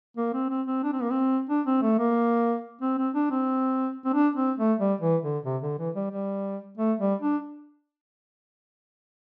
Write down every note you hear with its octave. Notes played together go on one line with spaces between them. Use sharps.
A#3
C4
C4
C4
D4
C4
A#3
C4
D4
C4
A3
A#3
C4
C4
D4
C4
C4
D4
C4
A3
G3
E3
D3
C3
D3
E3
G3
G3
A3
G3
D4